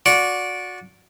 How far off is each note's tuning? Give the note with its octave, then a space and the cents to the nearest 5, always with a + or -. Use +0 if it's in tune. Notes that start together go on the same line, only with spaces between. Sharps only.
F#4 -25 D5 -15